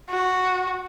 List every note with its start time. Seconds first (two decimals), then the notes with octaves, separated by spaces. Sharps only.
0.10 F#4